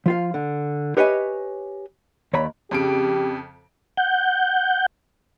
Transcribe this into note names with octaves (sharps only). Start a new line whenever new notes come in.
F3 F4 F5
D3
G4 B4 C#5 D#5 E5 G#5
D#2 C#5 D5 A#5 B5
F2 C#3 G4 D7
F#5 G6